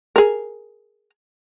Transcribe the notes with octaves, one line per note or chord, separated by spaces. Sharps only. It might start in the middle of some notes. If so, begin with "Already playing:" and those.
G#4 A#4